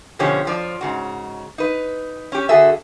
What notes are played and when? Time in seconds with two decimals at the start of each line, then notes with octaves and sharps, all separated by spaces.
0.19 B2 D3 F3 C#4 G4 C#5
0.45 F2 F3 D5
0.81 G#2 C#3 F#4
1.58 D#4 B4
2.32 C#4 G4
2.49 D3 F#4 G#4 A4 E5